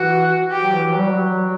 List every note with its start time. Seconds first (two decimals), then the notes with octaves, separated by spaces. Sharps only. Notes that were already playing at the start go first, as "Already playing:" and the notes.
Already playing: E3 F#4
0.51 G4
0.63 F#3
0.73 E3
0.84 E3
0.93 F#3
1.00 G3
1.09 F#3